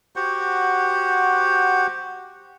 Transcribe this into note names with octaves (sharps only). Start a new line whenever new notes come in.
F#4 G4 C5 F#5